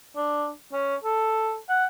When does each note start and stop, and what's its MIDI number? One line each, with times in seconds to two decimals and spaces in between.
0.16 0.50 62
0.73 0.95 61
1.04 1.58 69
1.69 1.85 78